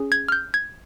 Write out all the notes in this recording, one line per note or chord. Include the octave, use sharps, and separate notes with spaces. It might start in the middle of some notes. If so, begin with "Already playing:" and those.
Already playing: C#4 G#4
G#6
F6
G6
G#6